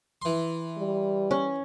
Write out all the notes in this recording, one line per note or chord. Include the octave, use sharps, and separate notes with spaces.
E3 C6
G3
C#4